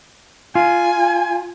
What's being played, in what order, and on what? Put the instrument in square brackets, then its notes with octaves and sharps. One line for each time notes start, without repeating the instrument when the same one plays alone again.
[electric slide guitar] F4 [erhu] G#5